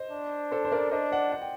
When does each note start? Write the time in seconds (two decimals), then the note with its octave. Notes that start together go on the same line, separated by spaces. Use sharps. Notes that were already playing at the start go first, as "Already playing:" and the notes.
Already playing: C5 D#5
0.11 D4
0.51 A4 C5
0.65 C5
0.72 A#4 D5
0.91 D4 C5 D#5
1.12 D5 F#5
1.32 F#5
1.42 G5